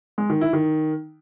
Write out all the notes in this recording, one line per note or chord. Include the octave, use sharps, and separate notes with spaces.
G#3
D#3
E4
D#3